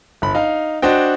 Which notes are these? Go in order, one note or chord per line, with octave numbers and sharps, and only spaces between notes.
G1 B5
D#4 F5
D4 F#4 C5 D#5 G5